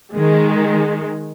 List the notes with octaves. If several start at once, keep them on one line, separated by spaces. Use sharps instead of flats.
D#3 G#3